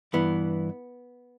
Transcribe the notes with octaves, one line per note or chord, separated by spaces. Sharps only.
G2 E3 B3